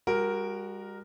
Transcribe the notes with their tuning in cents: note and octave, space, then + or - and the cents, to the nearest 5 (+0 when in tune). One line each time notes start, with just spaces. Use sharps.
G3 +40 F#4 +0 A#4 +0